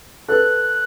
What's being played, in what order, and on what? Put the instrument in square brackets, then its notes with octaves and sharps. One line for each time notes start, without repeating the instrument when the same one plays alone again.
[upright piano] A4 B4 [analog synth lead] F#6